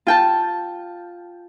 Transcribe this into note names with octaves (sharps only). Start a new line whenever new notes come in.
F4 G5 A5